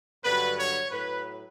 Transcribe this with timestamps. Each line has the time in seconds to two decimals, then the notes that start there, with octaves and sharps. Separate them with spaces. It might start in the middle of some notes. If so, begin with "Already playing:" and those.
0.24 G2 D3 F#3 B4
0.58 C#5
0.91 A2 F#3 B4